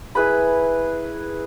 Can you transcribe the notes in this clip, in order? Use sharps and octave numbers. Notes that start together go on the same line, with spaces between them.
E4 G#4 B4 B5